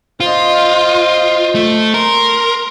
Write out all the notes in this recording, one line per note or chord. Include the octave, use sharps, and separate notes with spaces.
F4 C5 D#5
A3
A#4 C6